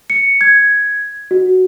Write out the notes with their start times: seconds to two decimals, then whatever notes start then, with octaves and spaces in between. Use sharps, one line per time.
0.10 C#7
0.41 G#6
1.31 F#4